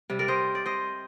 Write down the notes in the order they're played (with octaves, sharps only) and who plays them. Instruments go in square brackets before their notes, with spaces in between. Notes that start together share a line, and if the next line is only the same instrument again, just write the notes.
[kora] C3 G3
A#4 D5
C5 D#5
D5
C5 D#5